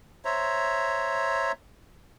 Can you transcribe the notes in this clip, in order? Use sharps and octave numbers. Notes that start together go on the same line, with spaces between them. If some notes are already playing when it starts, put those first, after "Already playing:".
C5 C#5 E5 A#5